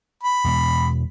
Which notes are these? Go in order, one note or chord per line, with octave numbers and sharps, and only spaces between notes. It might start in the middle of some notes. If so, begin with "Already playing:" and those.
B5
E2 B2 G#3